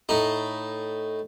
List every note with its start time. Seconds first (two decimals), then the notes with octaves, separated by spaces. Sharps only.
0.09 A2 D#4